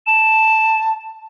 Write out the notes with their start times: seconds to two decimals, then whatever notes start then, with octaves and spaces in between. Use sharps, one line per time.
0.07 A5 E7